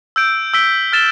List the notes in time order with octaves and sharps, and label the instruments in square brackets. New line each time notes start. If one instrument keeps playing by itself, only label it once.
[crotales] E6 G6 D7
E6 B6 D7 G7
F6 A6 E7 G7